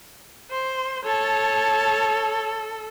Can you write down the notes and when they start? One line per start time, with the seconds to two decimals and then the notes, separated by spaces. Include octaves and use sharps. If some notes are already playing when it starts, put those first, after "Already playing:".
0.51 C5
1.05 A4 C#5 A5